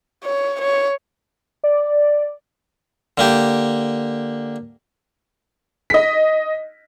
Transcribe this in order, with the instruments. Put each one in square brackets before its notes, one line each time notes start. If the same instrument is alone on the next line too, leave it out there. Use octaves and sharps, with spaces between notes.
[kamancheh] C#5
C#5
[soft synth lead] D5
[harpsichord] D3 A#3 G4
[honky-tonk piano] D#5 B6